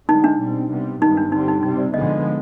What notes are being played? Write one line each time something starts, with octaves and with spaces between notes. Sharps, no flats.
D3 G#3 B3 D#4
D4
B2 G3 C4
C3 G3 B3
G2 D#3 G#3 B3 D#4
D4
D3 G3 C4 D#4
D#4
C3 G3 C4 D#4
D5
D3 F3 G#3 B3 D#5